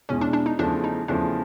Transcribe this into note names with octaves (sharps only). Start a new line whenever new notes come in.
E2 B2 G#3 C#4
D4
D4
D#4
E2 C#3 F3 A3 D4
D#4
E2 C#3 F3 A3 D4